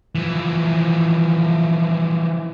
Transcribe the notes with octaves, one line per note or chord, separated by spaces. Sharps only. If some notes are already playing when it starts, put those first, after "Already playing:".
E3 F3